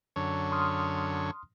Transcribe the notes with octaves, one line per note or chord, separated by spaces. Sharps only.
F#2 D3 C#5
C6 D#6 F6